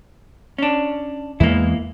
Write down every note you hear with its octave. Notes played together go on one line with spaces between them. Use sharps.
C#4 D4
E2 E3 G#3 A#3 E4